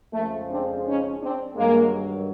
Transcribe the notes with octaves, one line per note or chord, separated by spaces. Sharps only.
F2 C#3 F3 G#3 A3
C4 D4
C#4 D#4
C4 D4
G2 D#3 F#3 G#3 A#3